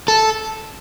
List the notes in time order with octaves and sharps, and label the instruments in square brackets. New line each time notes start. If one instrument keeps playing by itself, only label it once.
[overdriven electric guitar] A4